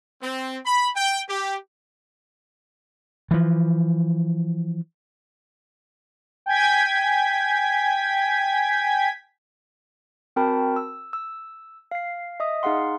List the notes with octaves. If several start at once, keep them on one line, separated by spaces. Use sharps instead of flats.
C4
B5
G5
G4
E3 F3
G5 G#5 G#6 B6
C4 F#4 A#4 G5 A5 B5
E6
E6
F5 C7
D#5 E5 D#6
D#4 G#4 F5 F#5 C6